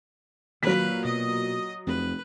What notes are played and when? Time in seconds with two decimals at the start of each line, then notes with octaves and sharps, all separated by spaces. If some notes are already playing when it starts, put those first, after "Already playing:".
0.63 A#2 D#3 F#3 B4 F5 B6
1.05 B2 D#5 D#6
1.87 F1 F2 F3 B4